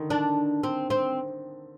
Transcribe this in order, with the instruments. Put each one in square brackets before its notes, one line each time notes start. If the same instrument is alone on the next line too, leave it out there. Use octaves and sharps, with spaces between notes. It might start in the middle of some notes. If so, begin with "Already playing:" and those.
Already playing: [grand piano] D3 D#3
[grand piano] D#3 [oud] D4
[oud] C4
C4